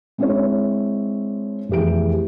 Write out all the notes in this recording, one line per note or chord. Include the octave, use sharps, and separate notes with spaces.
G#3 C4 D4 E4 G#4 C#5
F1 E2 E3 G4 G#4 D7